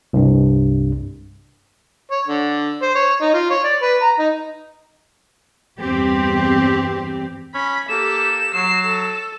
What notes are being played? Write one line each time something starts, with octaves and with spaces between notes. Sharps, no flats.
C2 G2
C#5
D3
C5
C#5
D#4
F4
C#5
D5
B4
A#5
D#4
E2 G2 C4 G4
C#4 B5
A#3 G4 A4 E7
F#3 C7
A4